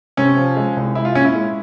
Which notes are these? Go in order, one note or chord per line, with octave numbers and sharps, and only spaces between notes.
C3 C#4
F3
G#3
C2
G#3 E4
F4
A#2 C#4
E4
G#3